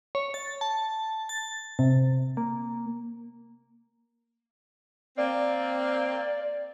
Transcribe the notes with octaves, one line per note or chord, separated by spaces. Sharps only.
C#5
A6
A5
A6
C3
A#3
A#3 C4 D5